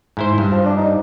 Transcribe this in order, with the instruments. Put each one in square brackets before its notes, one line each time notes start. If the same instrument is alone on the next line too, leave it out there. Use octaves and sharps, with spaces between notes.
[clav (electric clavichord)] G#2 E4 C5
G2
[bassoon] F3
D4
D#4